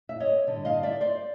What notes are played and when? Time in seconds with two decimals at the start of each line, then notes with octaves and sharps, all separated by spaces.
0.09 E5
0.20 C#5 D#5
0.47 G2 D3 G3
0.65 D#5 F5
0.83 D5 E5
1.01 C5 D5